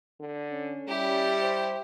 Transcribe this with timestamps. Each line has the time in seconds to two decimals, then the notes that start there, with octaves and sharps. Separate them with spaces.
0.20 D3
0.52 C#4
0.88 G3 E4 G4
1.41 C5